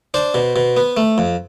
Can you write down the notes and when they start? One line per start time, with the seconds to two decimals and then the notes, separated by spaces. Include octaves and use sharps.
0.14 D4 C5
0.34 B2
0.56 B2
0.77 B3
0.97 A3
1.18 F2